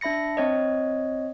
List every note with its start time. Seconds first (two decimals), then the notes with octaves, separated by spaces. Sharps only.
0.01 D4 E5 B5 A#6 C#7
0.37 C4 C#5 D#5